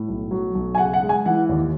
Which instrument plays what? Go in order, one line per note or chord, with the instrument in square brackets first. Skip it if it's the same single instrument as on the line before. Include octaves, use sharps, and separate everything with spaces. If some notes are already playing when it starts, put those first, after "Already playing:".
Already playing: [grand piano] A2
B1
F#3
B1
G#5
C#3 F#5
F#5
G#3
G#5
E3 F#5
D#2